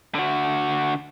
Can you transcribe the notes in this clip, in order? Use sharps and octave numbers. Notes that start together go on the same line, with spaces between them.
D3 F#4